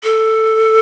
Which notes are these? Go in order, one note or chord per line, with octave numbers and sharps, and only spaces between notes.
A4